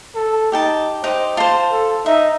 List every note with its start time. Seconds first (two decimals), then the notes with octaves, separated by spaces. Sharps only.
0.15 A4
0.52 D#4 G4 G5 A5
1.04 D#4 G4 C5
1.37 F4 C5 A5
1.71 A4
2.06 D#4 E5